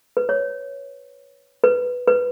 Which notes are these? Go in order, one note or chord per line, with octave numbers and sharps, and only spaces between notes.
B4
C#5
B4
B4